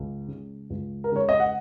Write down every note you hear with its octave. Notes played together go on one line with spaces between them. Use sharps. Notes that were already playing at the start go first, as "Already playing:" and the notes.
Already playing: C#2
C#3 G#3
C#2
A#4
C#3 G#3 C#5
D#5
F#5